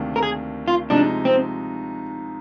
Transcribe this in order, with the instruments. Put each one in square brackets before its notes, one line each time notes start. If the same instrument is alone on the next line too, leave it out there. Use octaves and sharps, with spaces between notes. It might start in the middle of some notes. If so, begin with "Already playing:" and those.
Already playing: [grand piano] D2 C3 D#3 A#3 D4
[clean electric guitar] A#4
G#4
F4
[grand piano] C3 F3 G#3 D#4 [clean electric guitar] D4
[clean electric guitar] C4